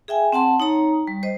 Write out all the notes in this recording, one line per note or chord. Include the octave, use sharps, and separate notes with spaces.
G#4 E5 G5 G#5
C4 F#5 A5 C6
D#4 C#5 A#5
G3
C5 D#5